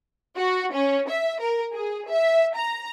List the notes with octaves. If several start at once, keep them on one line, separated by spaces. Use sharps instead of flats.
F#4
C#4
E5
A#4
G#4
E5
A#5